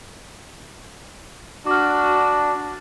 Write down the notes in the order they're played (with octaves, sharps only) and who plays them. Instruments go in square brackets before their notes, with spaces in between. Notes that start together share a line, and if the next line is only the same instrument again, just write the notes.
[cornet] D4 [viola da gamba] F#4 [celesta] D6 F6